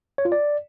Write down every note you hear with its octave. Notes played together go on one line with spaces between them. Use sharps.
C#5
F4
D5